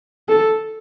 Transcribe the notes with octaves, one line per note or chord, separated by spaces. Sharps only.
A4